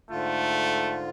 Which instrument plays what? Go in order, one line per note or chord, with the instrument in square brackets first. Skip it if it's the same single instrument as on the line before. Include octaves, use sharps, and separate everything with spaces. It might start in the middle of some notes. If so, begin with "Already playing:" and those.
[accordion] G#2 D3 F4 [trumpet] A3